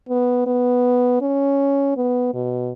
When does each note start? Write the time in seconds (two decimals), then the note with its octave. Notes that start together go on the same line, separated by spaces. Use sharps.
0.09 B3
0.47 B3
1.21 C#4
1.97 B3
2.34 B2